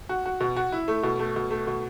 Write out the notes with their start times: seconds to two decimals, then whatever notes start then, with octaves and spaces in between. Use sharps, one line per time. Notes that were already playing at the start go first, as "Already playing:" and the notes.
0.09 F#4
0.26 F#4
0.40 B2
0.56 F#4
0.72 E4
0.88 A3
1.03 B2
1.19 A3
1.36 B2
1.51 A3
1.67 B2